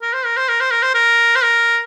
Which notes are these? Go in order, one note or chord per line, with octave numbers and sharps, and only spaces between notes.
A#4
C5
A#4
C5
A#4
C5
A#4
C5
A#4
C5
A#4